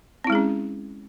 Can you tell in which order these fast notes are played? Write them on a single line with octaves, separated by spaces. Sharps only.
C4 E4 G#3 G#4 C#4